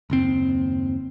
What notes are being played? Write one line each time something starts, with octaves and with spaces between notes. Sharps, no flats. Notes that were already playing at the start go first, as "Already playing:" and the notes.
F#1 D#2 C4